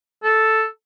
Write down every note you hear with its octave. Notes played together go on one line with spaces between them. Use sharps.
A4